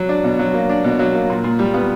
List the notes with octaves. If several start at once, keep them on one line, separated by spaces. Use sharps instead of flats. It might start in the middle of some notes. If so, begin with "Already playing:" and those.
Already playing: F#3
D4
B2
F#3
A#3
D4
B2
F#3
A#3
A#2
A#2
G3
B3